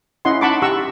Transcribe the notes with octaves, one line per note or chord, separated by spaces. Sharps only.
C#4 E4 D#5 F#5 C6
D#4 F#5 A5 B5 C#6 D6
G4 F#5 A#5 C#6 E6